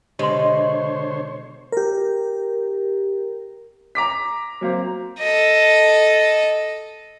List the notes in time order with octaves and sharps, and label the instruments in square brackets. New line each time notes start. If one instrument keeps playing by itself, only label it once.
[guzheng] B2 G#3 [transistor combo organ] D3 C5 C#5 [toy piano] G4 C6
[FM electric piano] G4 A#4
[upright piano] A#5 D6 B6
[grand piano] F#3 A#3 C4
[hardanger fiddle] A4 D#5